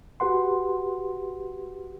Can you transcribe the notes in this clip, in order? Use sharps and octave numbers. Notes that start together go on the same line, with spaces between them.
F#4 G4 B4 F#5 C6